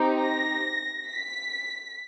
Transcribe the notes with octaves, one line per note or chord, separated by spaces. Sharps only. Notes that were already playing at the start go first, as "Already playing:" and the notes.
Already playing: C4 D#4 G4
A#6
B6